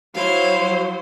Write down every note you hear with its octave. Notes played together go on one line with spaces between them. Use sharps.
F#3 E4 C5 F5 C6